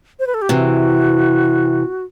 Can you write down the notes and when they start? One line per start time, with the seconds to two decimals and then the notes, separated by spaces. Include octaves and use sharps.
0.20 C5
0.27 B4
0.34 A4
0.42 G4
0.49 C3 E3 F#4